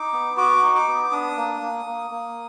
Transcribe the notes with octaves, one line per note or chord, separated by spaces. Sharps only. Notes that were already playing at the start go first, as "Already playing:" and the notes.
Already playing: D#4 D6
B3
F#4 D6
D#4
D6
B3
D4 D#6
A#3
A#3
A#3
A#3